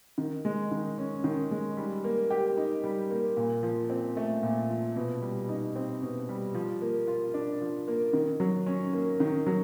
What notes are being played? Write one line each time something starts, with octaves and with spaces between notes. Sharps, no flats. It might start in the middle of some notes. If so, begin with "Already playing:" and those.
D#3
G#3
D#3
C#4
D#3
G#3
G3
A#3
G4
D#4
G3
A#3
A#2
F3
C4
A3
A#2
F3
B2
G3
D#4
C4
B2
G3
F3
A#3
F4
D4
F3
A#3
D#3
F#3
C#4
A#3
D#3
F#3